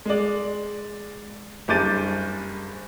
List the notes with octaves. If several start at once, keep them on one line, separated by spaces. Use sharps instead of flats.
G#3 D5
F#1 G2 D6 G6 A6 D#7